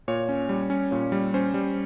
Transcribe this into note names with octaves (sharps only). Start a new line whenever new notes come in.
A#2 C#5
C#4
G3
C#4
A#2 C#5
G3
C#4 C5
G3